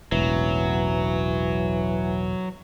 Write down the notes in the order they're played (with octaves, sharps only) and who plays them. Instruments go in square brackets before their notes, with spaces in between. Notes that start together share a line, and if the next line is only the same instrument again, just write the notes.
[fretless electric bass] E1 A1 [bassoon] E3 [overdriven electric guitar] F#3